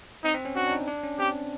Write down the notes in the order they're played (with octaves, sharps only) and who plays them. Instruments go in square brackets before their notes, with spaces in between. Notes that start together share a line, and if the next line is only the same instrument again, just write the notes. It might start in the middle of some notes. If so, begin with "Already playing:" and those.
[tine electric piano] C4 [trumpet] D#4
[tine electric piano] C4
C#4
[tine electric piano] D4 [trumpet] F#4
[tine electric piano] D4
D#4
D4
C#4
[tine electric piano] C4 [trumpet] G4